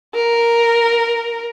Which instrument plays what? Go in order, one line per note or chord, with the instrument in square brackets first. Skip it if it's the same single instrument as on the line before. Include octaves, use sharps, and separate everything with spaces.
[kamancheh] A#4